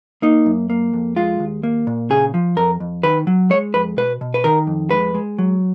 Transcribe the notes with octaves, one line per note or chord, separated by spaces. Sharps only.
A#3 D#4
F#2
A#3
F2
G#3 F4
D#2
A#3
A#2
C#3 G#4
F3
F2 A#4
F2
D#3 B4
F#3
G#3 C#5
F2 B4
B2 B4
B2
B4
D#3 A#4
F2
G#3 B4
G#3
F#3